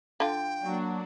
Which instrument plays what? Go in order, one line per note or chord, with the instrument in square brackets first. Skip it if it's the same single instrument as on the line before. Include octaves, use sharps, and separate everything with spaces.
[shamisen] D3 F4 [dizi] G5
[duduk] F#3 [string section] A#3 D4 F#4